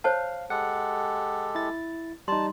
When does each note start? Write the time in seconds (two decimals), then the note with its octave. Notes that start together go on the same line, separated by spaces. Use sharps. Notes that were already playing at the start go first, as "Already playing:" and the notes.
0.04 C5 C#5 F5 A5
0.50 G#3 G4 A4 F#5
1.55 E4 A6
2.28 G3 D#4 A5 C6